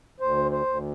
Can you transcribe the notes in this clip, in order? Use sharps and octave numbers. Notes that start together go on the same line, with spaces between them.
D2 C5
C5
D2